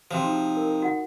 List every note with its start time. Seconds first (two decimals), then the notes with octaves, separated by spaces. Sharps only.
0.11 C3 F3 F#4 C5 C6
0.23 D#4
0.57 A#4
0.82 F#4 F#5